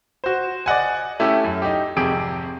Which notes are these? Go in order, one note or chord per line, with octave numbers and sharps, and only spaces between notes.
F#4 C5
D5 D#5 F#5 G#5
A3 C#4 E4 G4
F#2
D#4 G4
G#1 F2 C3 G4 G#4 D7